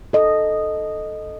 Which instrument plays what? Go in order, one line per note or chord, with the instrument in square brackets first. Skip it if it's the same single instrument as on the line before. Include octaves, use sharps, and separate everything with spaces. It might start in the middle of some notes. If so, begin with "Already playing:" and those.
[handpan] A4 D#5